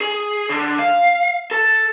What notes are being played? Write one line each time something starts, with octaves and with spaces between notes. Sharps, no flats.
G#4
D3
F5
A4